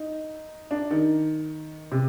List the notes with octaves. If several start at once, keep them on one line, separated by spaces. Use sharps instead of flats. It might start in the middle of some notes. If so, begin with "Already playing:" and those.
Already playing: D#4
D4
D#3
C3